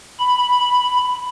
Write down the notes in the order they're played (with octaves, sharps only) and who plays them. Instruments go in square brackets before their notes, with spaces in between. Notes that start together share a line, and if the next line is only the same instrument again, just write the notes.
[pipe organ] B5